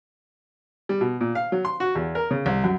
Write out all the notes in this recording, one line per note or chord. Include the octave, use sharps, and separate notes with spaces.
G3
B2
A#2
F5
F#3
C6
F#4
E2
A#4
C#3
C2
F#2